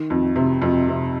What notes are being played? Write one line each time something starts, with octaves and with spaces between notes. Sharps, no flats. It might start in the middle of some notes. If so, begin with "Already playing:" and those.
Already playing: D#3
F2
C3
F2
C3